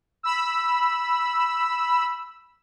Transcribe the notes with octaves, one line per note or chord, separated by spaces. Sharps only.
B5 E6